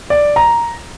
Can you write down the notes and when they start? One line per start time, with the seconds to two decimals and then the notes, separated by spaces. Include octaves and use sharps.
0.10 D5
0.36 A#5